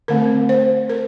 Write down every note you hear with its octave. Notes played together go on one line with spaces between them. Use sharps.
D3 A3 C4 A#4
C5
A#4